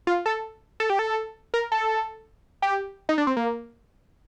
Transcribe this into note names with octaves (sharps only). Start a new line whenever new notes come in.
F4
A4
A4
G4
A4
A#4
A4
G4
D#4
D4
C4
A#3